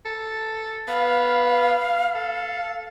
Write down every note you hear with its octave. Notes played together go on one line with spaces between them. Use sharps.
A4
B3 F5
A4